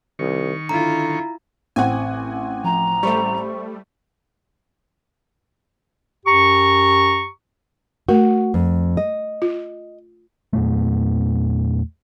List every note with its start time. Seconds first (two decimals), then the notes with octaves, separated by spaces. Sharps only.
0.19 C2 D#3 C#6
0.69 D3 E4 F4 A#5
1.76 A1 C4 F#5 G#5
2.64 F3 A#5
3.03 G3 A3 C5 B5 C#6
6.26 F#2 G4 A#5 C#6
8.09 A3 F#4 A#4
8.54 F2
8.97 D#5
9.42 F4
10.53 E2 A#2 A3